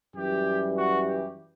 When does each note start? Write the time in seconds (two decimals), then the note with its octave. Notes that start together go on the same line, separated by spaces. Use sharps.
0.15 F#2 E3 G3 G4
0.76 F#4
1.05 G4